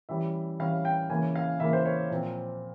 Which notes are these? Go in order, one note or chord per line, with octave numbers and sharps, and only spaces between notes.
E3 G3 C#4 E5
E3 G3 C#4 F5
G5
C#3 E3 A#3 C#4 G#5
F5
C#3 E3 A#3 C#4 E5
C5
C#5
A#2 F3 C4